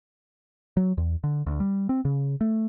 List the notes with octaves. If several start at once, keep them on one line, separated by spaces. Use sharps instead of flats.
F#3
E2
D3
D2
G3
C4
C#3
A3